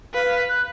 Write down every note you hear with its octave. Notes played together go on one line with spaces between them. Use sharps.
B4 F5
F5
F#6